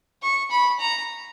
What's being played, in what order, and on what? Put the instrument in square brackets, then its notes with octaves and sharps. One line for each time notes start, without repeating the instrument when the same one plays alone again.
[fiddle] C#6
B5
A#5